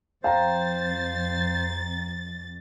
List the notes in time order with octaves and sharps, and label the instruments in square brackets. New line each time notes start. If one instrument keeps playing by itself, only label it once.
[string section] F2 A6 [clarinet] C5 [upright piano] F5 G5 A#5